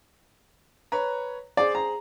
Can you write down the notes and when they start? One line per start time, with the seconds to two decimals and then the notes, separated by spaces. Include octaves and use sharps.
0.92 B4 C#5 A#5
1.57 G#4 C5 D5
1.75 A#5